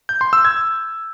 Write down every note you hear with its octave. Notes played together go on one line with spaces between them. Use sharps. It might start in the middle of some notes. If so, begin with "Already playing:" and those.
G6
C6
E6
G#6